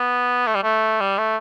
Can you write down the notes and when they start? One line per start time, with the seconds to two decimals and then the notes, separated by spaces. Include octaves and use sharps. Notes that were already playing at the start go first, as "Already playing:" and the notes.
Already playing: B3
0.47 A3
0.55 G3
0.63 A3
1.00 G3
1.18 A3